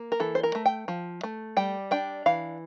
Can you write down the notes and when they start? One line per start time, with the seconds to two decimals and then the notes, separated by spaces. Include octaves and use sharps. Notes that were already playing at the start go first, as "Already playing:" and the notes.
Already playing: A#3
0.12 A#4
0.20 E3 A4
0.35 C5
0.43 A#4
0.55 A3
0.66 G5
0.88 F3
1.23 A3
1.57 G3 G5
1.91 D4 G5
2.26 E3 F5